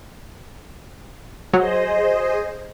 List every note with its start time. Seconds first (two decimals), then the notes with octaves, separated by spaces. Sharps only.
1.53 F#3 G#4 C5 D#5